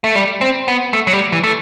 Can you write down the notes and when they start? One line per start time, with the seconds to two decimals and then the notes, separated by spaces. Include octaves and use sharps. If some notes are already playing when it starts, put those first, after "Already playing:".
0.04 A3
0.15 G3
0.41 C4
0.68 B3
0.93 A3
1.07 F#3
1.13 G3
1.32 E3
1.44 A3